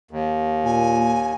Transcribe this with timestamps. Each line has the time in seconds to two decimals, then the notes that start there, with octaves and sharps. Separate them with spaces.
0.11 D#2
0.65 A#2 G#5